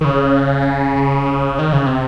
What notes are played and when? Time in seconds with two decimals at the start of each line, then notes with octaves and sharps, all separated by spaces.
0.01 D#3
0.05 C#3
1.59 D#3
1.73 C#3
1.86 C3